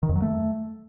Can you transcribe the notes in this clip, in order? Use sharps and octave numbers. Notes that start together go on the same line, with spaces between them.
D#3
F2
F#3
A3